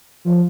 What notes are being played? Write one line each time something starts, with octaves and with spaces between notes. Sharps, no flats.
F3